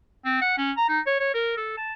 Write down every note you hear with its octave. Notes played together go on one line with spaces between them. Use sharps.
C4
F#5
C#4
A#5
D#4
C#5
C#5
A#4
A4
A5